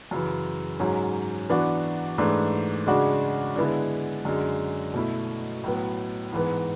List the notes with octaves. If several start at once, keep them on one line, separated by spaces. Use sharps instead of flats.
F#2 C#3 E3
G#2 F#3 C#4
E3 B3 D4 F#4
G#2 E3 A3 D4
C#3 G#3 D4 F#4
D3 G#3 B3 E4
F#2 D3 G#3
B2 A3 E4
A2 F#3 B3
G#2 E3 B3